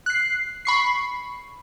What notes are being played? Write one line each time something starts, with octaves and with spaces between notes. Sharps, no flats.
F#6 C7
B5 C#6 C7